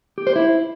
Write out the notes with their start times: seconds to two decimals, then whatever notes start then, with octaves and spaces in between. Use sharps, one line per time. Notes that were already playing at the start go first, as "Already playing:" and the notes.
0.18 G4
0.27 C5
0.36 E4